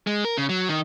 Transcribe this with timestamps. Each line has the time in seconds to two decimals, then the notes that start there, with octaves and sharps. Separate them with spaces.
0.07 G#3
0.25 A#4
0.38 C#3
0.49 F#3
0.69 D#3